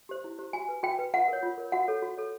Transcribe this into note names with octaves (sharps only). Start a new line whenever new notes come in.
G4 C5
E4
G4 C5
F#4 G#5
B4
F#4 G5
B4
F4 F#5
A#4 C#5
F4
A#4 C#5
F#4 F#5
A4 C#5
F#4
A4 C#5